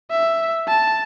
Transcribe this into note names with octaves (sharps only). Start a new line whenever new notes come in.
E5
A5